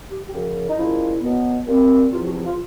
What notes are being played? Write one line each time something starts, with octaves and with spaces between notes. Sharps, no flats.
G4
G4
F#2 C#3 F3 F#4
D#4
A#2 F3 G#3 C#4 E4
B2 F#3 B3
A#2 G3 C4
E2 C3 F3 F4
F#4
E4
F4